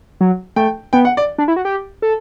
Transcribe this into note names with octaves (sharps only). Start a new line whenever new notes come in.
F#3
A3 G5
B3 G5
F#5
D5
D4
E4
F#4
G4
A4